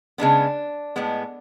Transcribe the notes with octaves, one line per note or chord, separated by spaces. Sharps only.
C#3 G#3 B3 D4
A2 G#3 B3